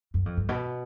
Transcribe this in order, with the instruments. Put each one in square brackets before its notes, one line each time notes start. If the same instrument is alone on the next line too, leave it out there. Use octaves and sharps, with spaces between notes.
[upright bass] F#2
F2
G2
B2